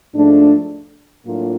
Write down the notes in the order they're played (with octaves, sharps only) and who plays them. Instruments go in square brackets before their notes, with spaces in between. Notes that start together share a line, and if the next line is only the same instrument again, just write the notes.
[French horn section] G#2 F3 A3 D4
A2 F#3 A#3 D4 F4